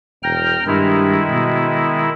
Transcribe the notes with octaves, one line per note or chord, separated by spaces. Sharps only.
E1 G5 A#5 F6
G2 D#3 G#3 E4
B2